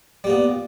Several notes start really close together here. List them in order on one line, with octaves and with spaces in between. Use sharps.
G3 A#2 B3